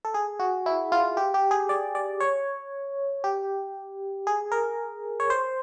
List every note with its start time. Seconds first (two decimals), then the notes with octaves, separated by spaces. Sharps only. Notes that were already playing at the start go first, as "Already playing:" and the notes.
0.05 A4
0.14 G#4
0.40 F#4
0.66 E4
0.92 F4
1.17 G4
1.34 G4
1.51 G#4
1.69 D5
1.95 D5
2.20 C#5
3.24 G4
4.27 G#4
4.52 A#4
5.20 C#5
5.30 C5